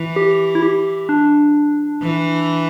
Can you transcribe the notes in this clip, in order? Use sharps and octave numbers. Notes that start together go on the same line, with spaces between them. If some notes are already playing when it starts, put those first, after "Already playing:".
Already playing: E3
G4
E4
G4
D4
E3